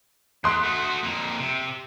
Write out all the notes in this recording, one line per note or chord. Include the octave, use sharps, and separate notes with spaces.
E2 C6 D#6 F#6
A3 F#4
F2 A#3
C3